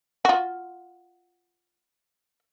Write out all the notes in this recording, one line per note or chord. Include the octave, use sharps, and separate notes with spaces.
F4 F#4